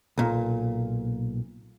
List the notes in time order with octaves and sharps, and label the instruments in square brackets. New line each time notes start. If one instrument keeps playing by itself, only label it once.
[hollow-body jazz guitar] B1 A#2